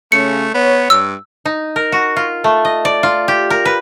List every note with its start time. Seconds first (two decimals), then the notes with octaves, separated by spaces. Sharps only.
0.12 C#3 A3 C#4 C#7
0.54 B3 C#5
0.90 G2 E6
1.45 D#4
1.76 A#4
1.92 F#4
2.16 F4
2.44 A3
2.65 D#5
2.85 D5
3.03 F4
3.28 G4
3.50 A#4
3.65 B4